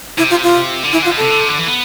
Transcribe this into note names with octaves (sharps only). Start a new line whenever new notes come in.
C3 E4
F4
F4
D3
E3 E4
D3 F4
B2
C3 A4
D3
C3
D3
E3
B3